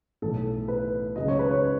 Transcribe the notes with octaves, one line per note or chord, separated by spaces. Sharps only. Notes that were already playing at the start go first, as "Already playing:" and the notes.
B1 A2 E3 A3 A4
B4
C#2 C#3 F#3 D#5
C#5
B4
C#5